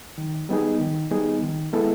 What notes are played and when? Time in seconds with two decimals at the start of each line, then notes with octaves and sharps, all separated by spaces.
0.18 D#3
0.49 G3 B3 D#4 G#4
0.80 D#3
1.11 G3 B3 D#4 G#4
1.42 D#3
1.73 G#3 B3 E4 A4